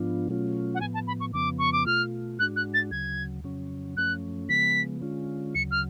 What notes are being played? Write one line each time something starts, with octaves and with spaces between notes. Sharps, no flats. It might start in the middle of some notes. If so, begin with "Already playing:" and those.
Already playing: G#2 F3 B3 D4 F4
B2 F#3 A3 C#4 F4
F#5
A2 F3 B3 G#5
A5
B5
C#6
F2 C#3 F3 B3 D6
C#6
D6
B2 A3 F4 F6
G#2 G#3 D4 F#4 F#6
F#6
A6
D2 C#3 F#3 G#6
F2 C#3 F#3 C#4
F#2 F3 A3 C#4 F#6
C#3 F3 G#3 B3 B6
D3 G#3 C#4 F4
D2 C#3 F#3 C#7
F6